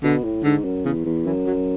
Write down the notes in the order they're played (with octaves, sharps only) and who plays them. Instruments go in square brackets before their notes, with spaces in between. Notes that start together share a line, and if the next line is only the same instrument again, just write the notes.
[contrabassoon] B2 [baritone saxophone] D3
[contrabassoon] A2
[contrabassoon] G#2 [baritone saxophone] D3
[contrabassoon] F#2
[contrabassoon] E2 [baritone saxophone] C#3
[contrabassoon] E2
[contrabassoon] F#2 [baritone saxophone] E3
[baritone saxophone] F#3